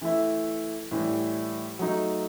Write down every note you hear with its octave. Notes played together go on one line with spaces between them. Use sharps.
E3 A3 E4
A2 E3 G3
F#3 A3 D#4